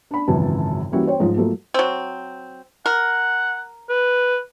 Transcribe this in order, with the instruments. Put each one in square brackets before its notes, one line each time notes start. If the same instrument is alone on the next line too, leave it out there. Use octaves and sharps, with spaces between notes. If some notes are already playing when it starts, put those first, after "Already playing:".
[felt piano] D4 B5
G#1 C#2 F#2 E3 E4 A5
E3 G3 A#3 C#4 E4 F#4
C5 C#5 G5
G#2 F3
F3 F#3 A3 A#3
[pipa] F#3 C4
[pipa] A#4 [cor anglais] F#5
[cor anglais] B4